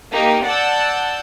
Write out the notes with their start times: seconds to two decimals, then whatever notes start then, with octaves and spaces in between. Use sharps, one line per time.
0.12 A#3 D#4 G4
0.46 D5 F#5 A5 E6 G6